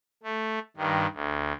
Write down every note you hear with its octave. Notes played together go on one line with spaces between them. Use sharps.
A3
G2 D#3
D2